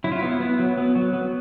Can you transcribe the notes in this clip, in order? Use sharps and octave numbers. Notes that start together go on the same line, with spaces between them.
F#3 E4
F4
B3 E4
B3
F#3
B3
F#3
B3